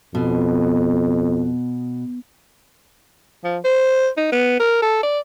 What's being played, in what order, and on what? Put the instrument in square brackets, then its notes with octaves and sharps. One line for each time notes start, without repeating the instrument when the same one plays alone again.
[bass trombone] F2 [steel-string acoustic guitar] B2
[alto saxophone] F3
C5
D#4
B3
A#4
A4
D5